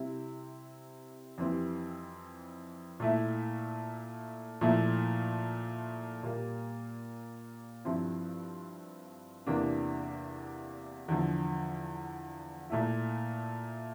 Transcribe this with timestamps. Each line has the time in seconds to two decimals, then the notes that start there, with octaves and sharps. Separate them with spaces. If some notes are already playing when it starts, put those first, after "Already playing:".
Already playing: C3 G3 C4 E4
1.38 F2 E3 G3 C4
3.00 A#2 A3 E4
4.61 A#2 F3 A3 E4
6.23 A#2 G3 A#3
7.85 G2 F3 C4 E4
9.47 E2 C3 E3 A#3 D4
11.08 E2 D3 F3
12.70 A#2 A3 E4